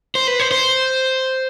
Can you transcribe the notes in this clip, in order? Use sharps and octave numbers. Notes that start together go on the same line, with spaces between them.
C5
B4
C5
C5